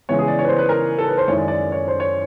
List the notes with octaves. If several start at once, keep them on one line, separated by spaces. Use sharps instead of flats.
C#3 E3 G#3 B3 C#5
G#4
D5
C#5
B4
C5
B4
A#4
A4
B4
C5
F#2 D#3 G#3 C#4 E4 C#5
D5
D5
C#5
C5
C#5